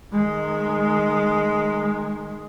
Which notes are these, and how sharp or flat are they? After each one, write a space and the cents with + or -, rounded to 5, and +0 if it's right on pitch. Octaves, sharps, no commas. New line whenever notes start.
D#3 -20 G#3 +0